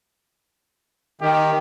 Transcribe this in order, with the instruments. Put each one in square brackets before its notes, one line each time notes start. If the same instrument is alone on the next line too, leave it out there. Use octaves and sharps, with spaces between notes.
[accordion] D#3 [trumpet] G4